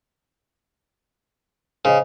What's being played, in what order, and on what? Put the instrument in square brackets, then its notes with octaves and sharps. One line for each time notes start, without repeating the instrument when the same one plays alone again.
[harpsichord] C#3 [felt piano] C5 D#5